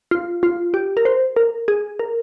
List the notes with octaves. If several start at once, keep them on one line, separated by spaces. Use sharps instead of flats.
F4
F4
G4
A#4
C5
A#4
G#4
A#4